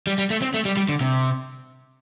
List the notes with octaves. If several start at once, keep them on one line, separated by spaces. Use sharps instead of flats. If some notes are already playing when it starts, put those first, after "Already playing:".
G3
G3
A3
C4
A3
G3
G3
D3
C3